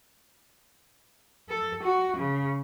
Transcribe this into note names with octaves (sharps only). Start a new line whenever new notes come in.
A4
F#4
C#3